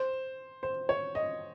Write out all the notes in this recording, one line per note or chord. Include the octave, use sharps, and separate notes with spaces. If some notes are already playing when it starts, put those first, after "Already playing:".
Already playing: C5
C5
C#5
D#5